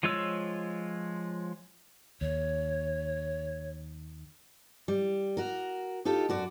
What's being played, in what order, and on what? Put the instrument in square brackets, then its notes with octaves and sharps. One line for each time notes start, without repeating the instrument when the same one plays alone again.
[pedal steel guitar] F3 G#3 F4 C#5 E6
[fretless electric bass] D#2 [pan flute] C#5
[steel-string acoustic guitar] G3
F#4 A#4
D#4 F4 G4 A4
F#2 F#4 D5